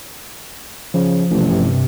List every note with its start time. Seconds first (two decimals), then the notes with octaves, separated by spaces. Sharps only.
0.94 C#3 F3
1.31 A1 G2 C3